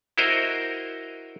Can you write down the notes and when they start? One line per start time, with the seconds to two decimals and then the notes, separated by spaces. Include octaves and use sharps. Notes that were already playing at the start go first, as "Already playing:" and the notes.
0.18 E4 F#4 A#4 C5 D#5